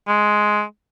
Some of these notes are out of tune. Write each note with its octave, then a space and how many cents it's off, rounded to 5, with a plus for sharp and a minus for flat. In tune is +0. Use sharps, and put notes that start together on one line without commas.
G#3 +10